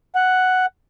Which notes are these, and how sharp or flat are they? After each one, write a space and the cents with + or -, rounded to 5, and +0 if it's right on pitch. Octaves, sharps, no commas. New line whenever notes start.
F#5 +5